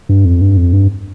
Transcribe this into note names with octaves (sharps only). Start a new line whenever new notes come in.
G2
F2
G2
F2
G2